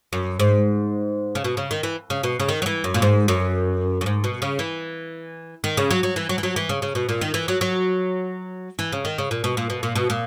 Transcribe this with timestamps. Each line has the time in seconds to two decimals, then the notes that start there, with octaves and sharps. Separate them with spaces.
0.13 F#2
0.39 G#2
1.35 C#3
1.44 B2
1.57 C#3
1.71 D#3
1.83 E3
2.10 C#3
2.23 B2
2.40 C#3
2.49 D#3
2.62 F#3
2.66 E3
2.84 F#2
2.94 A#2
3.02 G#2
3.28 F#2
4.01 F#2
4.06 G#2
4.24 B2
4.42 C#3
4.59 E3
5.64 D#3
5.77 C#3
5.91 F#3
6.03 F#3
6.16 E3
6.29 F#3
6.38 E3
6.43 F#3
6.56 E3
6.69 C#3
6.82 C#3
6.95 B2
7.09 A#2
7.21 D#3
7.34 E3
7.48 F#3
7.61 F#3
8.79 E3
8.92 C#3
9.05 D#3
9.18 C#3
9.31 A#2
9.44 B2
9.57 A#2
9.70 B2
9.83 A#2
9.95 B2
10.10 A#2